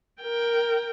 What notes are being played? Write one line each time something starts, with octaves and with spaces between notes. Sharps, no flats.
A#4 G5